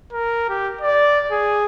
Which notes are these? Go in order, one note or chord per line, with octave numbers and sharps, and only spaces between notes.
A#4
G4
D5
G#4